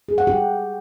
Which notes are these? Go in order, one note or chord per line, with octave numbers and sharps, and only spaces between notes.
G#4
F#5
G4